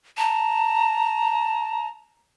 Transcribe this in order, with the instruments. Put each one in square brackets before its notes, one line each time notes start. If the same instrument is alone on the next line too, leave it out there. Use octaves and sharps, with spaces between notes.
[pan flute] A5 [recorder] A#5